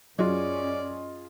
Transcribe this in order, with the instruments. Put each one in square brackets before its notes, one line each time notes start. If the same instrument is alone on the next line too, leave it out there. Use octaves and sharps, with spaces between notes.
[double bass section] F#2 C#4 [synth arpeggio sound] F#3 [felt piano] F4 G#4 D#5 [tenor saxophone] D5